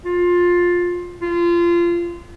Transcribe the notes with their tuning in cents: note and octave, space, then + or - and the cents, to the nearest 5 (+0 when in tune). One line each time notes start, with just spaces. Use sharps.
F4 +15
F4 -25